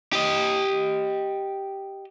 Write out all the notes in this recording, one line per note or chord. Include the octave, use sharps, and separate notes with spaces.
G4 D#5